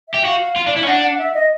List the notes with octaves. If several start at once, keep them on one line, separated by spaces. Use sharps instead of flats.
E5
G4
F#4 F5
F4
D4
E4
C#4
D4 F#5
F#5
E5
D#5